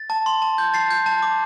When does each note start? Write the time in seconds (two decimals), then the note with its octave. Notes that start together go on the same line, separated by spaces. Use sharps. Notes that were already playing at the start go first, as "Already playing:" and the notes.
Already playing: A6
0.10 A5
0.26 C6
0.42 A5
0.58 G6
0.74 A5 A6 C7
0.90 G6
1.06 A5
1.22 D6